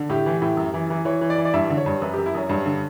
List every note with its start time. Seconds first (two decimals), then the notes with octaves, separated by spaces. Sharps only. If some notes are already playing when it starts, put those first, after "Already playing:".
Already playing: D3
0.09 A2 G4
0.26 E3
0.42 A2
0.57 F#2
0.74 E3
0.90 E3
1.05 E3 C#5
1.21 E3
1.30 D5
1.38 E3
1.45 D5
1.54 G2 E5
1.70 D3
1.77 C#5
1.86 G2
2.02 F#2 B4
2.13 F#2 G4
2.26 E4
2.34 F#2 C#4
2.49 G2
2.66 D3